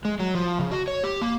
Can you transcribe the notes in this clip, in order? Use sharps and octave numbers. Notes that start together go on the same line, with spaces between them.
G#3
F#3
F3
C#3
F#4
C#5
G4
A#3